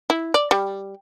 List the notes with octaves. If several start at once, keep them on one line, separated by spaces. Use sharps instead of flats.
E4
D5
G3